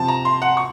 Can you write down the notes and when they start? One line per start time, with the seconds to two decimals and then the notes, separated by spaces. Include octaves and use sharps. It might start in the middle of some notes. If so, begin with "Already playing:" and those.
Already playing: C3 F3 C4 A5
0.08 A#5
0.25 C6
0.42 F#5
0.57 C#6